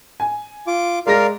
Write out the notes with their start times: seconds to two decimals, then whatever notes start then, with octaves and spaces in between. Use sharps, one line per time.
0.20 G#5
0.67 F4 D6
1.07 G#3 A#4 D5 F5 A#6